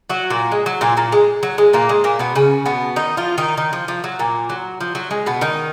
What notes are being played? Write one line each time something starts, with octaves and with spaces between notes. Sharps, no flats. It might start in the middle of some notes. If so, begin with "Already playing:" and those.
F#3 F#4
A#2 A#3
G#3
F#3
A#2 A#3
A#2 A#3
G#3
F#3
G#3
A#2 A#3
G#3
A#2 A#3
B2 B3
C#3 C#4
B2 B3
D#3 D#4
F3 F4
D#3 D#4
D#3 D#4
F3
F3
F#3
A#2 A#3
F#3
F3
F#3
G#3
B2 B3
D#3 D#4